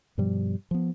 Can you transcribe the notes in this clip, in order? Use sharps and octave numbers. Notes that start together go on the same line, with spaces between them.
G2 B2 F3 G3
F3 B3